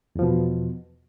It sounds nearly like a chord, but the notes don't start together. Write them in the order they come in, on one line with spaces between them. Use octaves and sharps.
E2 F3 B2